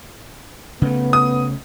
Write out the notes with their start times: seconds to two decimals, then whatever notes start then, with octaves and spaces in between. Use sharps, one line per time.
0.82 C#3 A3 B3
1.13 D#6